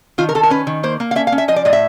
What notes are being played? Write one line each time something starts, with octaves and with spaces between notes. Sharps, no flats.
D#3 F4
A#4
D#3 A4
A#4
C#4 B4
D#3
A#3 C5
A#3
F5
C#4 E5
F5
C#4
E5
F3 D#5
D5
A2 D#5
E5